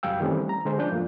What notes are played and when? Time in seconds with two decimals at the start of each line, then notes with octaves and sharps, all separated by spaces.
0.03 C#2 F#2 G3 F5 G5 E6
0.20 D#3 E3 G3 A3 C4 C#4
0.49 A#5
0.65 D3 G#3 C5
0.78 F3 C#4 D4 D5 G6
0.92 F#2 F3 A3 A#3